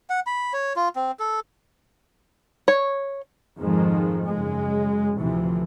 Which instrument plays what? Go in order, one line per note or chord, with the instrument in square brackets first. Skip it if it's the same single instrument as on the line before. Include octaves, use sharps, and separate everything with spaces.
[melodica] F#5
B5
C#5
F4
C4
A4
[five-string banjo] C#5
[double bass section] F2 G#2 D#3 F3 G#3
F#2 C#3 G#3
D2 A2 C3 E3 F3